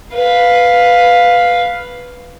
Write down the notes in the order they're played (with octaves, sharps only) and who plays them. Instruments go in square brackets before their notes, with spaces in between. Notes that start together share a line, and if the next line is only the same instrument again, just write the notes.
[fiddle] B4 F5